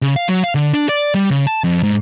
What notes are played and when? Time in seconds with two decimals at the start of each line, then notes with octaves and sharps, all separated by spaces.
0.02 C#3
0.16 F5
0.29 F#3
0.43 F5
0.55 D3
0.74 D4
0.89 D5
1.15 G3
1.30 C#3
1.47 A5
1.64 F2
1.83 G#2